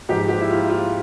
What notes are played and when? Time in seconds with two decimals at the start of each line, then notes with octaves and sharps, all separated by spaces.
0.09 G#2 F3 G4
0.29 G4
0.41 E4
0.49 F4
0.69 F4